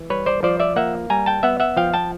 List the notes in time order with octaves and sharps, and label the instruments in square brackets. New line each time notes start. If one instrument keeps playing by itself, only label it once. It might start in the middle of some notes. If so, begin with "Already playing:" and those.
Already playing: [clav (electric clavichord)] E3
G3 B4 C#5
C5 D5
F3 C5 D5
D5 E5
A#3 E5 F#5
G3 G#5 A#5
G5 A5
B3 E5 F#5
E5 F#5
F3 F5 G5
G5 A5